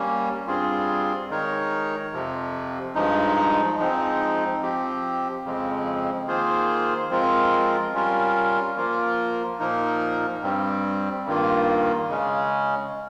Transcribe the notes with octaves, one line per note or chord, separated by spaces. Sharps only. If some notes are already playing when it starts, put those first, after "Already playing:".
Already playing: G3 A#3 C#4
G2 G3 C4 F4 G#4
D#3 G#3 D#4 A#4 C#5
F2 C3 F3
G2 F3 G#3 D#4
G#2 F3 G#3 C4 D#4
F3 C4 G4
F2 C#3 F3 G#3 C4
D#3 A#3 F4 G#4 C5
F3 G#3 C4 F4 A#4
G3 C#4 F4 A#4
F3 A#3 F4 A#4
A#2 F3 A#3 D#4 A#4
G2 G3 C4
G2 D#3 A#3 F4
C#3 G#3 C#4